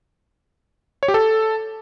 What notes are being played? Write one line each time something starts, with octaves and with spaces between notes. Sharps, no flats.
C#5
G4
A4